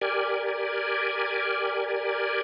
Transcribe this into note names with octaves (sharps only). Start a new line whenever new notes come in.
G4 A#4 D5 G#5